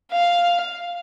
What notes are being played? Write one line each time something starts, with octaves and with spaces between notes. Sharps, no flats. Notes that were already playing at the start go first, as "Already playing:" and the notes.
F5